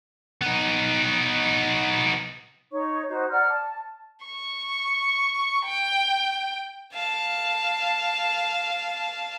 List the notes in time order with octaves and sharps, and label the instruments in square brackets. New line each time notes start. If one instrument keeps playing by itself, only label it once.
[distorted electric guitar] B3 D#4
[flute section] D#4 C#5 C#6
D#4 F#4 C5
D5 F#5 A#5 F6
A5
[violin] C#6
G5
[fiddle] F5 A5